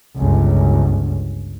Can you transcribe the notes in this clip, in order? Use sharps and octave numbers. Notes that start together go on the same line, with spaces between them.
G1 C#2